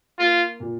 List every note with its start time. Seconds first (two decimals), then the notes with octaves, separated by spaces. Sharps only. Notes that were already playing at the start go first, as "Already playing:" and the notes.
0.19 A#3 F4
0.60 A#2